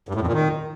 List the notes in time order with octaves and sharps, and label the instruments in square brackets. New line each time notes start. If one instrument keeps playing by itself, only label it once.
[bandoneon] G2
A2
F2
A#2
D#3